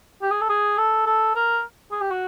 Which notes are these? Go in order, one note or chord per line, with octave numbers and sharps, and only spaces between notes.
G4
G#4
A4
G#4
A4
A4
A#4
G#4
G4
F#4